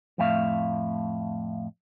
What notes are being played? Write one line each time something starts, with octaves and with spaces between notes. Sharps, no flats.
F2 A2 A3 E5 F5